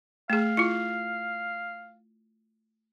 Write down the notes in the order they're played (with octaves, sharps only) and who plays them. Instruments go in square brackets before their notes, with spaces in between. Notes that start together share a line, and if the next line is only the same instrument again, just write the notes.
[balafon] A3 G#4 [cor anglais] F5
[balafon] E4 F4